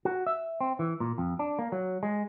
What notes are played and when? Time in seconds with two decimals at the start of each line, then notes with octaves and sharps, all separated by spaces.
0.05 F#4
0.27 E5
0.61 C4
0.79 E3
1.00 A#2
1.18 F2
1.39 D4
1.59 A#3
1.72 F#3
2.03 G#3